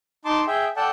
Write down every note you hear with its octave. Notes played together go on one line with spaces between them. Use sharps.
D#4 A5 C6 D6
G#4 E5 G5
A4 D5 F#5 G5 A5